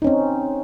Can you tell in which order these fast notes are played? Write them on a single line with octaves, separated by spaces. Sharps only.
D#4 C#4 C4